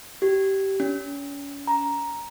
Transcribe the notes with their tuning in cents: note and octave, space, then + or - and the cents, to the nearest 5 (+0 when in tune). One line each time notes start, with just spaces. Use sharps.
G4 -20
C#4 +35
A#5 +10